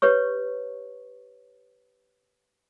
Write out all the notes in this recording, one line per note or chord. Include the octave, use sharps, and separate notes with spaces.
G4 B4 C#5 C#6